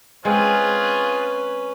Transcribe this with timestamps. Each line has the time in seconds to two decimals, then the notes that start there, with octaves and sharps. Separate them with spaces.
0.25 G#3 C4 C#4 F4 G#4 B4